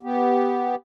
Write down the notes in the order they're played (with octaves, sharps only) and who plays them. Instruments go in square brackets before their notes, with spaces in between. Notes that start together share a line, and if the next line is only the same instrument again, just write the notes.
[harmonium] B3 G4